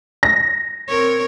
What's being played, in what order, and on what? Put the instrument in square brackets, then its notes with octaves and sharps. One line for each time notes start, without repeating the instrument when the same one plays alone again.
[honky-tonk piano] A#6
[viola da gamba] C4 A#4 C#5